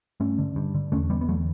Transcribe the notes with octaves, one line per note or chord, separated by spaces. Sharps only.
G2 A3 C#4
D3
G2
D3
E2 A3 C#4
D3 G3 B3
B3
E2 F#3 A3